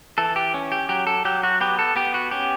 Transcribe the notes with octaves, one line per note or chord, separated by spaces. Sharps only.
E3 A4
G4
C#4
G4
F#3 G4
A4
F#3 G4
F#4
B3 G4
A4
B3 G4
F#4
C#4 G4